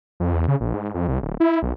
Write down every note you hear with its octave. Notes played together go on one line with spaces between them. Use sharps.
F2
E2
C#3
A#1
G#2
F2
C2
D1
E4
B1